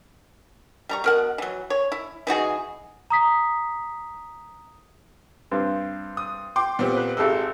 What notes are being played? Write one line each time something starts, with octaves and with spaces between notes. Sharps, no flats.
G3 A#5 C#6
B2 A#4 F#5
E3 F#3
C#5
E4
E3 D#4 F#4 G#4
A#5 D#6 B6
G2 C4
D#6
G5 C6 D6
A#2 B3 C4 G4
B4
G#1 G#3 G4 A4 E6